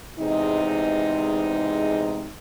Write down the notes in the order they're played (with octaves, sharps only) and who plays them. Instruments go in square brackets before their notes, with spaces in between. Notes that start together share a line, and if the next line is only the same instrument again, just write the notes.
[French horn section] E2 G#2 C3 G#3 D#4